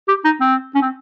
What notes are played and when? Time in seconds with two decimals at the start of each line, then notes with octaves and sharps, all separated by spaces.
0.08 G4
0.25 D#4
0.41 C4
0.75 C#4
0.82 C4